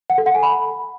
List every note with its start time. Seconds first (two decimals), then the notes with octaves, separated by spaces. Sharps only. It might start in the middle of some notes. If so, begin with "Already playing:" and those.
0.10 F#5
0.18 A4
0.26 F#5
0.34 G#5
0.43 B5